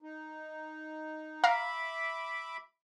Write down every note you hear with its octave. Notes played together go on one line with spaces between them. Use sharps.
D#4
E5 F5 A#5 B5 D6